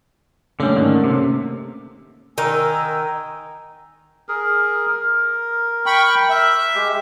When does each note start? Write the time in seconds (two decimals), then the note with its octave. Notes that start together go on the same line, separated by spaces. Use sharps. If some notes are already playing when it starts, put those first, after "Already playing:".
0.60 D3 G3 A3 A#3 C#4
0.76 G#2 D3 D#3
1.04 C3
2.38 D#3 A#4 D#5 G#5 E6
4.29 G#4 A#4
4.88 A#4
5.86 G5 B5 C#6
6.30 E5
6.75 G#3 G4